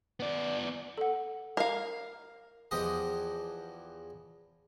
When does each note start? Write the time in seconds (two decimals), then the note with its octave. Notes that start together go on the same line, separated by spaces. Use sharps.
0.20 B3 D5
0.98 A4 F#5
1.57 A#4 F5
2.71 E2 F3 G4 D#5